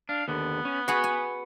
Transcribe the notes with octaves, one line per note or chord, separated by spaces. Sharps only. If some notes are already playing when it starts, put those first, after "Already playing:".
D4 F5
D#2 D3 B3
C#4
F#4 G#4 B4 F#5 B5
G#5